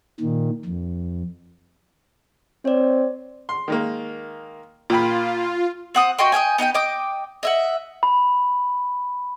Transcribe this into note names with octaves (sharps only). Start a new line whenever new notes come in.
A#2 D#3
F2
C4 C#5 D5
C6
D#3 G#3 A#3
A#2 F4 G5 B5
C4 F#5 D#6
F#4 D#5 G5 C6
D#5 F5 G5 G#5
B3 D#4 D#5 G5
D#5 G5 D6 D#6
D#5 E5 F#5
B5